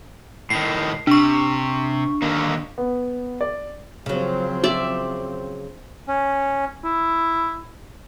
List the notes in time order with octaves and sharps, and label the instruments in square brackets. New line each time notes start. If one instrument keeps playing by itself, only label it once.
[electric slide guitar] A2 D#3 [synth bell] C7
[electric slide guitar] C3 [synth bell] D4 C#6
[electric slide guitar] D3 D#3 A#3
[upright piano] B3
D5
[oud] C#3 F#3 [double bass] F3 C4
[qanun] D5 E5
[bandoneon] C#4
[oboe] E4